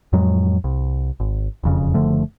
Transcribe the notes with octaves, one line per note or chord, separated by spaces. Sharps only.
F2 A2 F#3 G#3
C2
G#1
E1 F2 C#3
F#1 D3 F3 A3